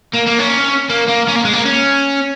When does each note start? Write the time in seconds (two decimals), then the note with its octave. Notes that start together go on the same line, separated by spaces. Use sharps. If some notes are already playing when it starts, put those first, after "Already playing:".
0.13 A#3
0.26 A#3
0.39 C#4
0.90 A#3
1.08 A#3
1.28 C#4
1.36 A#3
1.45 G#3
1.53 A#3
1.65 C#4